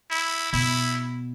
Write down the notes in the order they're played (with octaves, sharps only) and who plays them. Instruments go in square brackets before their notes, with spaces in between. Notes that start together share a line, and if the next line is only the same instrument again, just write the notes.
[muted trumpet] E4
[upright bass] B2 [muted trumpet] E4